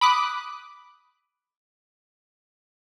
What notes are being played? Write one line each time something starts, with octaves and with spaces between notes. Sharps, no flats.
B5 D6 D#6 F#6